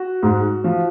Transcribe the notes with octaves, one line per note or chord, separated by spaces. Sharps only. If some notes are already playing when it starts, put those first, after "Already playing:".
Already playing: F#4
G#2
F3